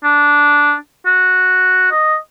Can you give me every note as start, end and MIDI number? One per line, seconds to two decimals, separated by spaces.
0.04 0.74 62
1.06 1.89 66
1.92 2.15 75